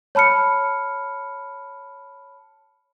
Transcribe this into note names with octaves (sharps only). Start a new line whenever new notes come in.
C#5 A5 B5 F6 C#7